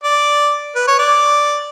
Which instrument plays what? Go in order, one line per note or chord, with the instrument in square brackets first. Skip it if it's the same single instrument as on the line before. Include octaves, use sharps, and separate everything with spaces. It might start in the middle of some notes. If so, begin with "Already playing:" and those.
[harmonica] D5
B4
C#5
D5